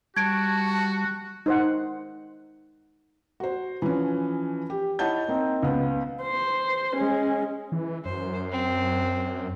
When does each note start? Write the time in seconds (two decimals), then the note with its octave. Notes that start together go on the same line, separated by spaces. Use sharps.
0.17 G3 F#4 A5 C#6 G#6 D7
1.46 D#4 C5 F#5
3.40 F#4 C5
3.82 E3 F3 C#4
4.70 G4
4.99 E4 C#5 D#5 F#5 A5 G6
5.28 A#3 C4 D#4 D#5
5.63 C#2 B3
6.23 C5
6.97 G#3 C#4
7.72 E3
8.05 F#2 C5
8.52 C4